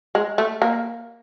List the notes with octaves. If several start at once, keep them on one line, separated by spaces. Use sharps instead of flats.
G#3
A3
A#3